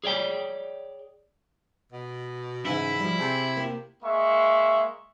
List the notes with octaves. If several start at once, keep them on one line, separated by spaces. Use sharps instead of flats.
G#4 C#5 D5 G5
B2
G#2 C#3 E3 E4
F3 G3
C3 G#4
A#3 G4
G#3 A#3 E5 C#6